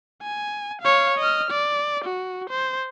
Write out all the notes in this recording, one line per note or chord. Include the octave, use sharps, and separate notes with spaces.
G#5
C#5 F5
D#5 F6
D5
F#4
C5